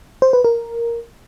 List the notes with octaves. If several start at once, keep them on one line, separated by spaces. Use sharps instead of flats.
C5
B4
A#4